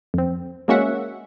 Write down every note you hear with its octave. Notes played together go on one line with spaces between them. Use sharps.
F2 C4
G#3 A#3 C#4 F#4 E5 F#5